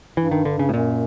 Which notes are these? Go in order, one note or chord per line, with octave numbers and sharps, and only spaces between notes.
G2 E3
D#3
D3
C#3
A2
F#2 A#2